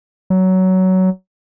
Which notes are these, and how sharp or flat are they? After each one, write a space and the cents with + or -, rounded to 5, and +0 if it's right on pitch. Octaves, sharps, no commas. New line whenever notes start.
F#3 +15